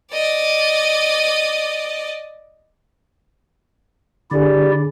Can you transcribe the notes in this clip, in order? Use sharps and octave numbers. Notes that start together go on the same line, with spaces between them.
D5 D#5
D3 E4 G4 G#4 D5